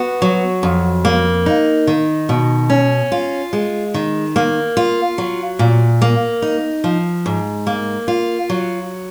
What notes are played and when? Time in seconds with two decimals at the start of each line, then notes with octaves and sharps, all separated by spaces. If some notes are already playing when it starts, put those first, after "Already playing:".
Already playing: B3 F#4
0.22 F#3
0.63 F2
1.05 A#3
1.46 D#4
1.87 D#3
2.29 B2
2.70 C#4
3.12 F4
3.53 G#3
3.94 D#3
4.36 A#3
4.77 F4
5.18 F#3
5.59 A#2
6.02 A#3
6.42 D#4
6.84 F3
7.26 G#2
7.67 A#3
8.08 F4
8.50 F#3